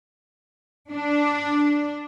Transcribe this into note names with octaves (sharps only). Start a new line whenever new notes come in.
D4